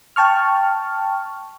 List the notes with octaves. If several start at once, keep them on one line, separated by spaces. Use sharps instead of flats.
G5 A5 C#6 F6